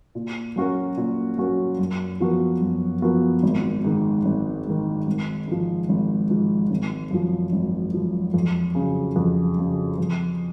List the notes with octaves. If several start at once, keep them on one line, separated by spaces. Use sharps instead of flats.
A#2
F#3 C#4 F#4 A#4
A#2
F#3 C#4 F#4 A#4
F#2
F3 B3 F#4 A#4
F#2
F3 B3 F#4 A#4
G#1
G#2 D#3
G#1
G#2 D#3
G#1
G#2 F3
G#1
G#2 F3
G#1
F#2 F3
G#1
F#2 F3
F2
C#3 F#3
F2
C#3 F#3
F2